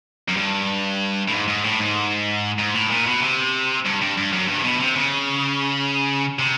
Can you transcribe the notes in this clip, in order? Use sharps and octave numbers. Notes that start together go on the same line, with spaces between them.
F#2
G2
A2
G#2
G#2
A2
G#2
G#2
A2
A#2
B2
C3
G2
G2
G2
F#2
G2
C3
B2
C3
C#3
C3